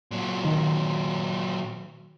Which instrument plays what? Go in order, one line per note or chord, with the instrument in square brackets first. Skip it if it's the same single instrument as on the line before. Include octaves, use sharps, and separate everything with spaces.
[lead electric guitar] A#2 F#3
[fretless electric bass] D#3